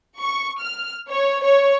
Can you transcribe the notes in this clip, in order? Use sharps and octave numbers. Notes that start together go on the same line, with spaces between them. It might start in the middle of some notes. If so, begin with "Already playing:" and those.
C#6
F6
C#5
C#5